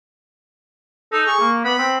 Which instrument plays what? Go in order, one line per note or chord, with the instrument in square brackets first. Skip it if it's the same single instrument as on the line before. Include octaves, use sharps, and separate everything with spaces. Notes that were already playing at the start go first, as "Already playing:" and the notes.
[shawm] D#4 [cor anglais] A4
[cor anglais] G#4 [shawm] C#6
[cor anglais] A#3
[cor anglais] B3 [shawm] B5
[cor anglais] C4